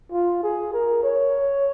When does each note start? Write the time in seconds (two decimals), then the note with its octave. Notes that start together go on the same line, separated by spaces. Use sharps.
0.12 F4
0.43 G#4
0.73 A#4
1.03 C#5